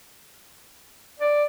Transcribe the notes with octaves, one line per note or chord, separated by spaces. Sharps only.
D5